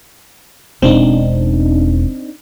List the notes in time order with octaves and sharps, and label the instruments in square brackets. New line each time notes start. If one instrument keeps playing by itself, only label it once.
[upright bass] E1 [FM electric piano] C4 D4 D#4